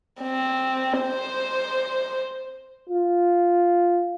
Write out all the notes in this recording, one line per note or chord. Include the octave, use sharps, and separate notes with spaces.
C4
C5
F4